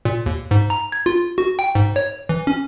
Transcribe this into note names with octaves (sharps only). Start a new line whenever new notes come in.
A#2
D#2
G#2
A#5
G#6
F4
F#4
G5
G#2
C#5
E3
C#4